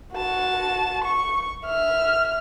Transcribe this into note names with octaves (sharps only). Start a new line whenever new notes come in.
F#4 A5
C#6
E5 F6